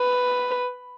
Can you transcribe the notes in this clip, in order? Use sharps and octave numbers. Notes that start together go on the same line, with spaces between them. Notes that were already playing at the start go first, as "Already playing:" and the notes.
Already playing: B4